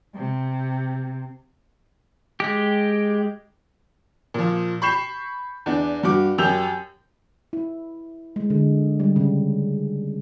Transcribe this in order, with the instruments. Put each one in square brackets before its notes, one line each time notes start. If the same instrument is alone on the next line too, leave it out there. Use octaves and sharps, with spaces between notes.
[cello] C3
[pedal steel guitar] G#3 G4
[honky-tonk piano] A#2 F3
B5 C#6 G6 C7 E7
E2 D4
G2 F#4 D6
F#2 G4 E6 G6 F7
[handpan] E4
G#3
D3
G3
C#3